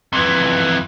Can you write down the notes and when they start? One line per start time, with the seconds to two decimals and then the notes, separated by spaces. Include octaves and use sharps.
0.13 F2 E3